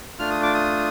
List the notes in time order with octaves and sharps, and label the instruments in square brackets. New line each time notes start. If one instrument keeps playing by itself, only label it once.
[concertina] A3 D4 F4 F6
D#6
D6
D#6